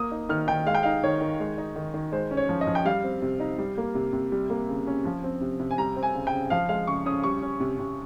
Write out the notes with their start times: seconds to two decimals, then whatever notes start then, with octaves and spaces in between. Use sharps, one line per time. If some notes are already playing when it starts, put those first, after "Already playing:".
Already playing: A#3 D#6
0.11 D#4
0.29 D#3 F6
0.48 D#3 G5
0.66 G#3 F5
0.75 G5
0.83 D#4 F5
1.03 D#3 C#5
1.21 D#3
1.40 G#3
1.58 D#4
1.76 D#3
1.94 D#3
2.12 G#3 C5
2.31 C#4
2.37 C#5
2.49 F3
2.61 D#5
2.67 F3
2.75 G5
2.85 G3 F5
3.04 C4
3.22 C3
3.40 D#4
3.58 G3
3.78 A#3
3.95 C3
4.13 C3
4.32 G3
4.50 A#3
4.69 C#3
4.87 C#4
5.05 F3
5.23 C4
5.41 C3
5.60 C3
5.71 G#5
5.78 G3 A#5
5.96 C4
6.03 G#5
6.15 C#3
6.27 G5
6.33 C#3
6.50 F3 F5
6.69 G#3 F5
6.87 C#3 C#6
7.06 C#4 D#6
7.24 G3 C#6
7.42 C#4
7.60 C3
7.79 C3